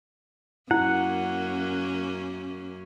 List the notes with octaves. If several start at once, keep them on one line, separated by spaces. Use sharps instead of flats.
F#2 A#3 C#4 E4 F#5